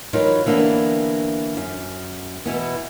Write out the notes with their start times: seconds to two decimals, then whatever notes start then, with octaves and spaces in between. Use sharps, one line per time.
0.13 E3 F#3 D#4 F4 A#4 B4
0.46 D3 E3 A#3 B3 D4
1.57 F#2
2.46 B2 E3 B3